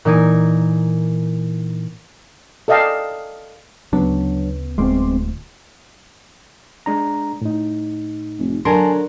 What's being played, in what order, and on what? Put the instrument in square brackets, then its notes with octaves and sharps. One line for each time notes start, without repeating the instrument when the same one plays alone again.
[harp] A#2 E3 D#4 A#4 G#5 D#7
[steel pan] A4 D5 D#5 F5 G5 A5
[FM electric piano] D2 C#3 B3 [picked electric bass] F#3 D4
[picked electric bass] D1 D2 [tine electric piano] G#3 B3 C4 [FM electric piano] C6 D6
[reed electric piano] G#3 D4 A#5
A2 D#4
[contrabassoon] F1
[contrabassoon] D3 [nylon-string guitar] F#3 A#4 [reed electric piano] G#5 A5 C6